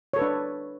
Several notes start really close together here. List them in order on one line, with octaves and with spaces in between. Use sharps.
C#5 A4 B4 D4